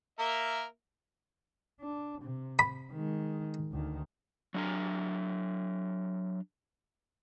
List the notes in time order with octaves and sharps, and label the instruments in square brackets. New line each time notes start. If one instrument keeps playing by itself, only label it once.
[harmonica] A#3 A#4 E5
[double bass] D4
C3
[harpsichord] B5
[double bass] D#3 G#3
D2 D#3
[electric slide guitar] F#3 D4 A#5